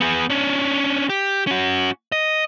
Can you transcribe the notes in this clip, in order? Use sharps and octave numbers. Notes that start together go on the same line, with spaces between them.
B3 G#4
C#4 D4
G4
C#4 F#4
D#5